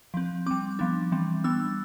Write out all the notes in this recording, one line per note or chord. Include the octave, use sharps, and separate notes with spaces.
F3 C4
G3 C4 D6
F3 B3 D4
E3 G3 C4
G3 B3 D4 E6